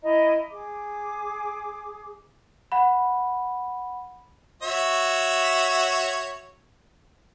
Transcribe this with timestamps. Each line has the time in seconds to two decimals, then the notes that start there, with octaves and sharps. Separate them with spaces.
0.03 E4 D#5 A#5
0.51 G#4 D6
2.72 F#5 B5
4.63 F#4 C#5 E5